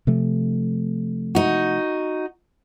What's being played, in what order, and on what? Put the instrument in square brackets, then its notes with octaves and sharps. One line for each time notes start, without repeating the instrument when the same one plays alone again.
[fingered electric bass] C3 F3 A3
[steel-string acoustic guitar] D#4 F#4